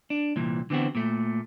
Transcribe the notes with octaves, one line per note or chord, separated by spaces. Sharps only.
D4
C2 A#2 E3
D3 E3 B3 C4 F#4
A#2 A3